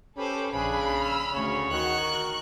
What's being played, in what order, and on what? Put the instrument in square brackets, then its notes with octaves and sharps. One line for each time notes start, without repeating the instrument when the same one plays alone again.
[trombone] C#4 [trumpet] G4 [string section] A4 [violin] B4 C5
[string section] A#1 D4 F#6 [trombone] C#3 [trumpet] G#4 [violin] B5
[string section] E6 F6
[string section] D2 [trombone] C#3 [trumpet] C#5
[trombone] D#3 [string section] F#4 [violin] C#6 F#6
[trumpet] A#4